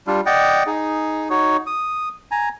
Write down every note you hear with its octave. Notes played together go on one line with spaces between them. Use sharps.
G3 D4 F4
D5 D#5 F#5 G5
D#4 G#4
D#4 F#4 C#5
D#6
G#5 A#5